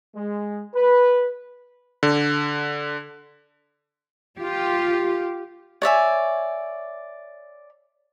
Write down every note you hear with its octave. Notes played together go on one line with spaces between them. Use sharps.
G#3
B4
D3
F4 G4
C#5 D5 E5 G#5